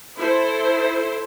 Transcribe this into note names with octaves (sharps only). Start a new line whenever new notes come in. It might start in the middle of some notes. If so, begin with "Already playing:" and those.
E4 A4 C5